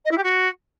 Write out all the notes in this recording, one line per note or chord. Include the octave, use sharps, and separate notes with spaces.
D#5
E4
G4
F#4